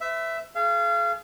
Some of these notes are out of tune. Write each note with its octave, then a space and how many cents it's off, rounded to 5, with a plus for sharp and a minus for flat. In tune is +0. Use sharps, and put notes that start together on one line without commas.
B4 +45 E5 +5
G#4 +40 F5 -30